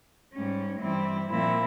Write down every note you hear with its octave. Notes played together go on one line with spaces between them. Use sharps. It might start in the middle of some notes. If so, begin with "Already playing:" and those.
G#2 G3 C#4
G2 E3 G3 C4 E4
A#2 F3 C4 E4